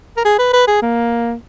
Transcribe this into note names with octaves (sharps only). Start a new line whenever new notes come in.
A#4
G#4
B4
B4
G#4
A#3